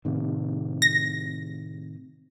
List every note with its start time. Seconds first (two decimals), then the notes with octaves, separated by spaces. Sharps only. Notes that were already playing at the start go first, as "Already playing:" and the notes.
0.05 A2 C3 D#3
0.82 A#6